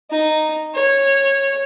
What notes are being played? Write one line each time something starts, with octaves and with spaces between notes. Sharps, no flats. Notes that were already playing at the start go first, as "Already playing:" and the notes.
D#4
C#5